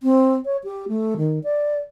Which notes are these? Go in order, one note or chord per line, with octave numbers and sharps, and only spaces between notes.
C4
C#5
G4
A3
D#3
D5